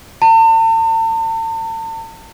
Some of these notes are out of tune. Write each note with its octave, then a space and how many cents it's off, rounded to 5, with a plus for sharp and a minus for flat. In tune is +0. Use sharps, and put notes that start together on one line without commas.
A5 +40